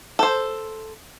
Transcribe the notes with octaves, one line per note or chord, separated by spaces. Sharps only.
A4 C5